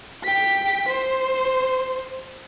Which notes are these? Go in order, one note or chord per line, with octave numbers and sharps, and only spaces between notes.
G5 B6
C5